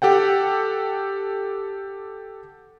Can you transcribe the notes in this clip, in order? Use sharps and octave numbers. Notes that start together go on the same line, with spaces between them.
G4 A4 F#5 G5